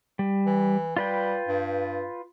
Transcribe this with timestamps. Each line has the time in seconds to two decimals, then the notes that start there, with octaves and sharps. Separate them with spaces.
0.19 G3
0.46 E3
0.97 G3 F4 B4 G5
1.48 G2